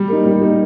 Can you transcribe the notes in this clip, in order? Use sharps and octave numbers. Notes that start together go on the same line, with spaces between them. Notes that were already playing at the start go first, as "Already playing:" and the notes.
Already playing: G3
A#3 D#4
G3
A#3 D#4